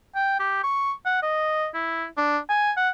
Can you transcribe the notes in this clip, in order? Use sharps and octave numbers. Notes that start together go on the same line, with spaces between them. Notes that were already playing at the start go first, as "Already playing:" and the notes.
G5
G4
C#6
F#5
D#5
E4
D4
G#5
F#5